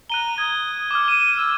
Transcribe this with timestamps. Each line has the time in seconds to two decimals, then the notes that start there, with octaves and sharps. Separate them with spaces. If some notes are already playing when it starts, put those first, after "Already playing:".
0.10 A#5 F#6 D#7 G7
0.38 D#6 G#6
0.91 D6 F6
1.08 D#7 E7
1.37 E6